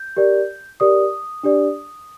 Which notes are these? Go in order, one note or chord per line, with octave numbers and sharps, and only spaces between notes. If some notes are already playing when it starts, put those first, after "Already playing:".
Already playing: G6
G4 A#4 D5
G4 A#4 D5 D#6
D4 G4 D5